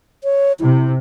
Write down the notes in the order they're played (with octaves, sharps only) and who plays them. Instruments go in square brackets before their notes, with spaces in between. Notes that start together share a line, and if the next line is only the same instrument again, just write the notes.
[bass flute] C#5
[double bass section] C3 [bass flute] E4